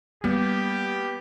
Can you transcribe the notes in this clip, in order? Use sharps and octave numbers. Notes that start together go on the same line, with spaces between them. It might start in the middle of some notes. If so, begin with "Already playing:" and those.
G3 A#3 B3 G4